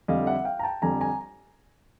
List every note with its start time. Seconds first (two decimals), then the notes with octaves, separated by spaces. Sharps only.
0.08 F2 D3 G3 D#5 F5
0.27 E5 F#5
0.45 F5 G5
0.59 A#5
0.63 G5 A5
0.82 F2 D3 G3 G#5 A#5
1.01 G#5 A#5